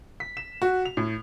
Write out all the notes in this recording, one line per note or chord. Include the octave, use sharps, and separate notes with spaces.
B6
E7
F#4
F7
A2